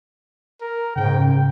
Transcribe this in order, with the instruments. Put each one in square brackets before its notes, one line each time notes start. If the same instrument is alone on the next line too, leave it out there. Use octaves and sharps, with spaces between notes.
[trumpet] A#4
[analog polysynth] G#2 C#3 [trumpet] G5